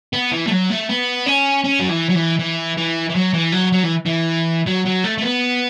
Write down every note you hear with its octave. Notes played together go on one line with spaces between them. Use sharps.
B3
E3
A3
F#3
A3
B3
C#4
C#4
F#3
E3
F#3
E3
E3
E3
E3
F#3
E3
F#3
F#3
E3
E3
F#3
F#3
A3
A3
B3